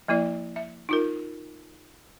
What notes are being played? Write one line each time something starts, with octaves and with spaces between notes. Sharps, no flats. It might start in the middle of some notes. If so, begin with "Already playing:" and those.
F3 A#3 E4 D5
E5
D#4 F4 A#4